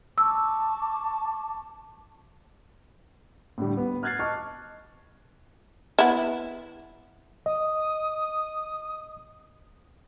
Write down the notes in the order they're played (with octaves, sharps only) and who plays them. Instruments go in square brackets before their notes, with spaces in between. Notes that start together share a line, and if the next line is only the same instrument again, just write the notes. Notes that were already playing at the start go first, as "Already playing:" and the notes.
[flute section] A5 C#6 D6 [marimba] E6
[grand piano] A2 D3 G3
B3
F6 F#6 G#6 A6 C7
D#5 A5 C#6 D6 F6
[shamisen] B3 E4
[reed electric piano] D#5 [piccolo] D#6